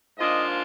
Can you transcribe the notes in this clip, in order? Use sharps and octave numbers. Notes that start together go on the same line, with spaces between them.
G#2 F3 A#3 D4 F4 D#5